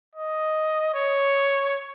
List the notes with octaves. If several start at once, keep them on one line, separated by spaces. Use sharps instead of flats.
D#5
C#5